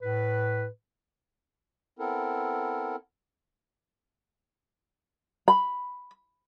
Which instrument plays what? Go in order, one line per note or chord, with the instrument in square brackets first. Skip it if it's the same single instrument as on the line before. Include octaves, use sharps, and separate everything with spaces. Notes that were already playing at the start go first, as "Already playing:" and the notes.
[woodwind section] A2 B4
[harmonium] B3 C4 E4 A4 A#4
[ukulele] B5